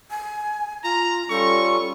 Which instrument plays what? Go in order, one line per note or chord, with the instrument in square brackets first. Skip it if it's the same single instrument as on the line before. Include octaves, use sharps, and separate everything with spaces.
[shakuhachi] G#5
[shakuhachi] F4 [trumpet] A#5
[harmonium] G3 C#4 F4 [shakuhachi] A4 [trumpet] C#6